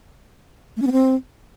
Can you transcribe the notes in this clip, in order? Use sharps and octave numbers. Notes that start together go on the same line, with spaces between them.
A3
C#4
B3
C4